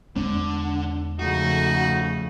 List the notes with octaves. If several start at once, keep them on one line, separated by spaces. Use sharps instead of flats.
E2 D3 G#3 C4
C#3 F3 A3 D#4 F#4